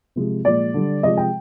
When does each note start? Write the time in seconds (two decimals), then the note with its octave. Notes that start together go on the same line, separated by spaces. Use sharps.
0.16 C3 F3 G#3
0.44 A#2 F3 G#3 D5
0.74 D3 G3
1.03 C3 F3 G#3 D#5
1.17 G5